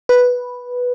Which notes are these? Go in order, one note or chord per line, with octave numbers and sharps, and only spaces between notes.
B4